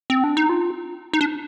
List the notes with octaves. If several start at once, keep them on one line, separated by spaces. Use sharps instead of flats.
C4
D4
D#4
F4
D#4
D4